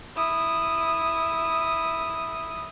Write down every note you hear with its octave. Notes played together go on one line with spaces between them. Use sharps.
E4 D#6